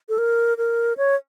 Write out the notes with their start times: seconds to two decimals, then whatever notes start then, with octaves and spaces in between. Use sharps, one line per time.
0.09 A4
0.18 A#4
0.58 A#4
0.97 C#5